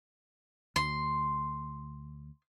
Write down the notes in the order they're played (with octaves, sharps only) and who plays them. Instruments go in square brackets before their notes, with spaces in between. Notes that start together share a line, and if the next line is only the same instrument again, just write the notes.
[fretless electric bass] D2 [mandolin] C6